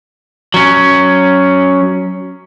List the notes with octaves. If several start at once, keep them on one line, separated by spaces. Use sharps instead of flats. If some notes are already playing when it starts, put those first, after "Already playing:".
F#3 C#4